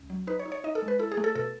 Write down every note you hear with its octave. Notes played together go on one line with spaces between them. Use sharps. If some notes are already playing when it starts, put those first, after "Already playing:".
Already playing: C#2
F#3
D#4 B4
C#5
D#4
C#5
D#4 D#5
A4
G#3
B4
E4 A4
G#4
A3
A4
B2 A4